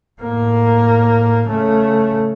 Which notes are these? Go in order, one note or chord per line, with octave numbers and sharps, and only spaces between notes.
A2 A#3
C#3 A3